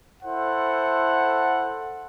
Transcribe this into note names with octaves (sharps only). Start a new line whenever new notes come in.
E4 A4 C5 F#5